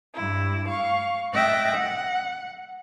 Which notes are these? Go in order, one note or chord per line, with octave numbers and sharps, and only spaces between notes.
G2 E4
F5 C#6
D#5 E5 G5 F#6 A6 A#6
F#5